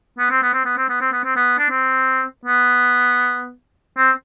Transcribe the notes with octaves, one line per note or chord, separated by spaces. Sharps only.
B3
C4
B3
C4
B3
C4
B3
C4
B3
C4
B3
D4
C4
B3
C4